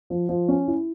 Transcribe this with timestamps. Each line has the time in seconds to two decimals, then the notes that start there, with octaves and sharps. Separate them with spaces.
0.10 F3
0.29 F3
0.48 C#4
0.67 E4